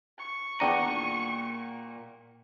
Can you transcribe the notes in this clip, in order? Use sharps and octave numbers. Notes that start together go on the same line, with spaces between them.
C#6
E2 A#2 D4 F#5 G5 A#5 D#7